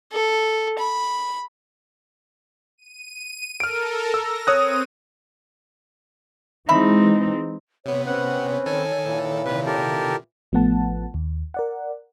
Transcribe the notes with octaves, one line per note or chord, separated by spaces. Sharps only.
A4
B5
D#7
A4 A#4 F6 D7
E6 A#6
C4 C#5 D#6 F#6 D#7
E3 G#3 C4 D#4 E5 B5
C3 B3 C#5
C4 C#4 B4 C#5 F#5
D#3 A4 G#5
A#2 E3
C3 D#3 B4
G4 A4 A#4
A1 F3 A3 B3 F#5 A5
D#2
A#4 D5 F#5